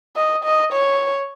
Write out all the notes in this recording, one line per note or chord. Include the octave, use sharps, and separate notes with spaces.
D#5
D#5
C#5